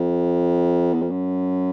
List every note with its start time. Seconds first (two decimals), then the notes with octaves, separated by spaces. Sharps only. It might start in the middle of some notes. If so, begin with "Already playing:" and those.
Already playing: F2
0.93 E2
1.02 F2
1.10 F#2